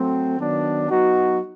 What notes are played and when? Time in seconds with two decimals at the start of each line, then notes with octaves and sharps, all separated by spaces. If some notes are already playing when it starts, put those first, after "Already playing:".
Already playing: F#3 A3 C4
0.39 D#3 F#3 B3 D4
0.89 F#3 B3 D#4 F#4